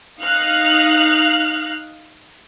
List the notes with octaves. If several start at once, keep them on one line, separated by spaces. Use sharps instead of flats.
D#4 F5 F6 F#6